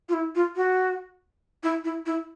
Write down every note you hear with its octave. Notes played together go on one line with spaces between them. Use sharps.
F4
E4
F4
F#4
E4
E4
E4